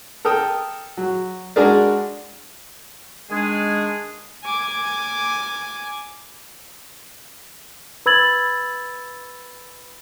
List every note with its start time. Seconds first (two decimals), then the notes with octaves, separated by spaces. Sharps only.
0.25 A4 A#4 G5 D#6
0.97 F#3
1.56 G#3 D4 F#4 G#4 A#4 D5
3.30 D#3 G#3 D4 G#4
4.44 G#5 D6
8.06 B4 B5 E6 G#6 A6 F#7